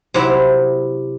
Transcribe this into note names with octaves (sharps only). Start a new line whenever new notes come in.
C3 F#3 C4 E4